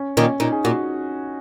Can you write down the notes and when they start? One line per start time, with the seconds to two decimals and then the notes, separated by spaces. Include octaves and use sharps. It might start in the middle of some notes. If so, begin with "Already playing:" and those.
Already playing: C#4
0.17 A#2 D#3 C#4
0.40 A#2 D#4
0.52 G#4
0.64 A#2 F#4